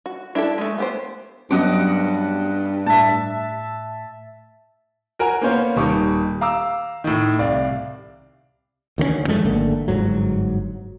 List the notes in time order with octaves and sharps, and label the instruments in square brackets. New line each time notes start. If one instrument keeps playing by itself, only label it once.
[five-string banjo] F#4
D4 E4 G4 A4
G#3 A3
B3 G4 C5
[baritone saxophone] G2 [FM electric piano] F#3 B3 C#4 [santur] D#5 F#5 D6
[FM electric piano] A2 [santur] E5 A5
[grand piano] F#4 A#4 G#5 A#5
A#3 B3 C#4 C5 C#5 F5
D#1 D#3 G3 C#6 D6
F5 A#5 D6 E6
A2 D#3
C2 D5 F5
[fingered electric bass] D2 D#3 A3 C#4
F#2 F3 G#3 A3
G#1 D3 A3 A#3
G1 G#2 F#3